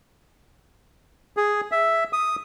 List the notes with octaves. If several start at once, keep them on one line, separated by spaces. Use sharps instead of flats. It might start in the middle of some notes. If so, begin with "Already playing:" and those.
G#4
E5
D#6